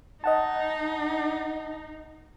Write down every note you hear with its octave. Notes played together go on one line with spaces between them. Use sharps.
D#4 D#5 F#5 A5